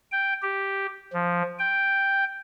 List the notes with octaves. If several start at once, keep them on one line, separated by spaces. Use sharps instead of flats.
G5
G4
F3
G5